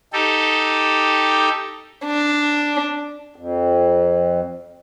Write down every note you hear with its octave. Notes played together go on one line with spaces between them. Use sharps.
D#4 G4 A4
D4
F2